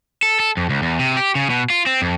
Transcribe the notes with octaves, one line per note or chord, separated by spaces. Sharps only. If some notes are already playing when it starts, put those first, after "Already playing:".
A4
A4
F2
C#2
E2
C3
G4
C#3
B2
F4
C4
F2